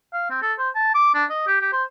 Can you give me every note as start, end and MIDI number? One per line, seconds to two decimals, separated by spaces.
0.13 0.27 77
0.30 0.38 60
0.42 0.53 69
0.59 0.69 72
0.75 0.90 81
0.94 1.14 86
1.14 1.25 62
1.30 1.42 75
1.47 1.61 67
1.61 1.70 67
1.72 1.84 72